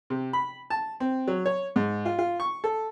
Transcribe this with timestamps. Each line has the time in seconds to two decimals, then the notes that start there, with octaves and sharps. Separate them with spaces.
0.10 C3
0.33 B5
0.70 A5
1.00 C4
1.28 F#3
1.46 C#5
1.76 G#2
2.05 F4
2.19 F4
2.40 C#6
2.64 A4